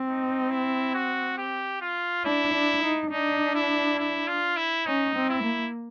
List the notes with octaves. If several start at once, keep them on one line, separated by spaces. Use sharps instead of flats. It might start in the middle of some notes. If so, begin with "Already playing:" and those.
Already playing: C4
D#4
E4
F#4
G4
F4
D4 E4
D4
D#4
D4 D#4
E4
E4
F4
E4
C#4 D#4
C4
E4
A#3